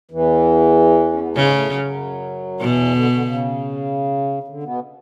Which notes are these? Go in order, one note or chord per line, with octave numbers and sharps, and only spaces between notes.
E2 E3
C#4
B3
A3
G#2 C#3 G#3
A2 A3
F#2 F#3
F#2 F#3
E2 B2 E3
D3
D3
C#3
C#3
D3
B2 B3